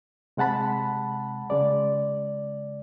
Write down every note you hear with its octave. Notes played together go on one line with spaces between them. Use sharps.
C3 G#3 F#5 A5 B5
C#3 G#3 D5